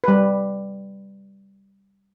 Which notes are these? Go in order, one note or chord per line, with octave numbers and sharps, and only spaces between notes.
G3 B4